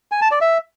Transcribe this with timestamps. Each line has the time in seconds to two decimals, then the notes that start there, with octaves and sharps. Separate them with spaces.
0.12 G#5
0.21 A5
0.31 D5
0.41 E5